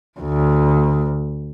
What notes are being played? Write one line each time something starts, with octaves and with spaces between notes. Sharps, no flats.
D2